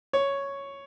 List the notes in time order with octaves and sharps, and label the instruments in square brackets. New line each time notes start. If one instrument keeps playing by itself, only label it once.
[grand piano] C#5